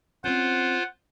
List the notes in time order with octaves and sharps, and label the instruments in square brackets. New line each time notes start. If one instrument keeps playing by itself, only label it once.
[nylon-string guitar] C4 C#4 [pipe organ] F4 C5 [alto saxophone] F#5